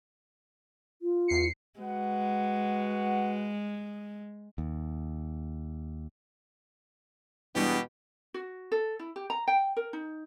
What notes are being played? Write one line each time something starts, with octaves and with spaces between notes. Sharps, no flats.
F4
E2 C7 C#7
G#3 F#4 B4 F#5
D#2
E2 B2 G3 G#3 B3 D4 G4
F#4
A4
E4
G4
A#5
G5
A#4
D#4